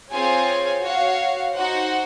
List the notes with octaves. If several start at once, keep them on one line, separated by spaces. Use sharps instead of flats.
C4 F4 G#4 C#5 G#5
F#4 C#5 F5
D#4 F#4 C5 F#5